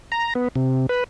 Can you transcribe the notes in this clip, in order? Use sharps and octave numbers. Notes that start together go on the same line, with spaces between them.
A#5
B3
C3
B4